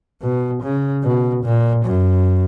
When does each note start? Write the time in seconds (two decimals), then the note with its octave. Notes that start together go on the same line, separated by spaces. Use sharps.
0.22 B2
0.62 C#3
1.03 B2
1.44 A#2
1.85 F#2